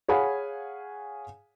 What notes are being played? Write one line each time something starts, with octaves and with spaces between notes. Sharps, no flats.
G#4 C#5 F5 F#5 G#5 B5